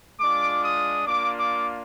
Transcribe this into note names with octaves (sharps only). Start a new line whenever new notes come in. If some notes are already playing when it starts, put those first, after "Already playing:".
G#3 D4 F4 D6
D#6
A#3 D4 F4 D6
D6